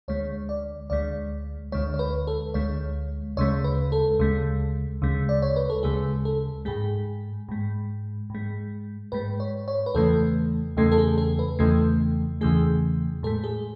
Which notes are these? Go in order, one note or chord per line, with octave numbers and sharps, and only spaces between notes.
D2 D3 G#3 C#5
D5
D2 D3 G#3 D5
D2 D3 G#3 C#5
C#5
B4
A4
D2 D3 G#3 C#5
D2 C#3 G#3 C#5
B4
A4
D2 C#3 G#3
D2 C#3 G#3
D5
C#5
B4
A4
D2 C#3 G#3 G#4
A4
G#2 G#3 G#4
G#2 G#3
G#2 G#3
G#2 G#3 B4
C#5
C#5
B4
E2 C#3 E3 A3 A4
E2 C#3 E3 A3 A4
A4
G#4
A4
B4
E2 C#3 E3 A3 A4
E2 C#3 E3 A3 G#4
A2 G#3 A4
G#4